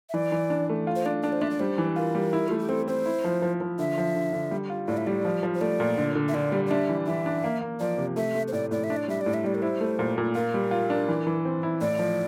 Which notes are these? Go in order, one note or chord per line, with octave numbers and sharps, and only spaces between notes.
E5
E3 D5
E3
D4
A3
F4
C5
D4 D5
D4 D5
C5
D4 E5
D5
G3 C5
E3
F4 A#4
G3
E4
A3 F4
G4
C4 A4
C4 C5
E4
F3
F3
F3
D3 E5
F3
D3
D3
G3
F4
A2 D5
E5
G3 D5
F3
F3
C5
A3 D5
A#2
D3
D3
E5
D3 D5
G3
D5
D4 E5
E3
E3 E5
D4
A#3
A#3
F3 D5
C3
A3 E5
A3
C5
A2 D5
A2 D5
E5
D4
D5
G3 E5
A2 D5
E5
G3 D5
A#4
E4 C5
A3
A#2
A#2
F4 A#4
G3
F4
D4
E3
E3
C4
E4
A2 D5
F3